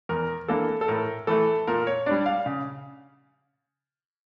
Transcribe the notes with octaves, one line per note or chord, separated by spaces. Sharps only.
E2 A#4
E3 A#3 D4 A4
A4
A2 A#4
E3 A3 A4
A#2 A#4
C#5
G3 D4 D5
F5
C#3